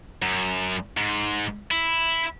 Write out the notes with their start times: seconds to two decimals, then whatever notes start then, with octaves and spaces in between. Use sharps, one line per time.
0.22 F#2
0.97 G#2
1.71 E4